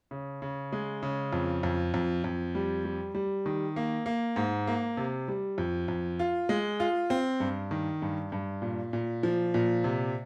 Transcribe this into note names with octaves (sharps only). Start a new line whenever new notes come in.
C#3
C#3
G#3
C#3
F2
F2
F2
F2
G3
G3
G3
D#3
A#3
A#3
G#2
A#3
C3
G3
F2
F2
F4
G#3
F4
C4
G2
D#3
G2
G2
A#2
A#2
F3
A#2
C3